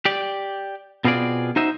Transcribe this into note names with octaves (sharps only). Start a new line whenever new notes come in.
G4 D5
B2 B3 C4 F4 G#4 D5
D#4 F#4 C5 D#5 E5